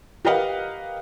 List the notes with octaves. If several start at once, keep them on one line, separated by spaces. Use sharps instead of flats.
G4 A#4 B4 D#5 F5 F#5